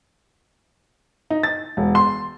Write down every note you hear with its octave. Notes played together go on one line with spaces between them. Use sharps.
D#4
A6
E1
C6